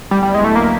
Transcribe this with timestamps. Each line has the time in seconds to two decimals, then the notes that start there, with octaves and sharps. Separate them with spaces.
0.11 D2 D3 F#3 G3 B3 E4
0.23 G3
0.34 G#3
0.44 A3
0.56 A#3